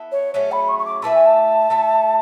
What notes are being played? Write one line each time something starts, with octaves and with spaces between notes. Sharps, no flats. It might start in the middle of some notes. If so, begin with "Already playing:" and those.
Already playing: B3 E4 A4
C#5
F#3 A3 C#4 G#4 C#5
B5
C#6
C#6
D6
A3 E4 B4 E5 A5
G#5
A5
A3 E4 A4